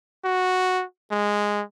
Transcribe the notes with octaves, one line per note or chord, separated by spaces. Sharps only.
F#4
G#3